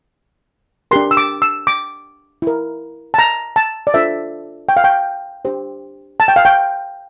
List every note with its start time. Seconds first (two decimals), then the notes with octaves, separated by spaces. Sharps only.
0.91 D4 G4 A#4 C6
1.11 E6
1.17 D6
1.42 E6
1.67 D6
2.42 E4 A#4
3.14 A5
3.19 A#5
3.56 A5
3.87 D5
3.94 D4 F4 A4 C5 E5
4.69 G5
4.77 F5
4.84 G5
5.45 D4 G4 C5
6.20 A5
6.28 G5
6.36 F5
6.45 G5